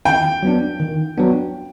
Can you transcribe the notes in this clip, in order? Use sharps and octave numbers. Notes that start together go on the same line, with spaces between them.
D#3 G5
F#3 B3 D4
D#3
F#3 B3 D4